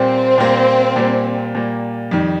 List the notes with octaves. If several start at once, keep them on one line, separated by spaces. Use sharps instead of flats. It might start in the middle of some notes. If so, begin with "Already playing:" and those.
Already playing: A#2 G3 A#3 C4
A#2 G3 A#3
A#2 G3 A#3
A#2 G3 A#3
F2 D#3 G3